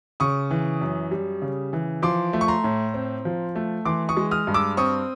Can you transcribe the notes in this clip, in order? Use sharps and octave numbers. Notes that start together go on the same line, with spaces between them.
C#3 C#6 D#6
E3
F#2
G3
C#3
E3
F3 C6 D6
A3
C#6
A#5 C6
A2
C4
F3
A3
E3 C6 D6
C#6 D#6
G#3
D#6 F6
G2
D6 E6
C4 C#6 D#6